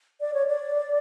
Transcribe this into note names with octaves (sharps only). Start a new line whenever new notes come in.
D5
C#5
D5